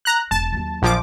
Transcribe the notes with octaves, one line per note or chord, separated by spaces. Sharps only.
A#5 F#6
E1 A5
D#2 F#3
A#1 F3 D6